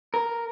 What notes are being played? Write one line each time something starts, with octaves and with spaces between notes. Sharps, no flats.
A#4